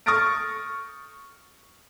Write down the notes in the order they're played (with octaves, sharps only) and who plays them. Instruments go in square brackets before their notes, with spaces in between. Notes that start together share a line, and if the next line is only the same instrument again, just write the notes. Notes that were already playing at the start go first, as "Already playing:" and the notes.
[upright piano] C#6 D#6 F6 A6 A#6 D7